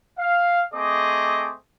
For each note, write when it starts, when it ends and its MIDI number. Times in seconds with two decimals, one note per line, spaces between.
0.19 0.62 77
0.74 1.52 57
0.74 1.52 60
0.74 1.52 68
0.74 1.52 75
0.74 1.52 86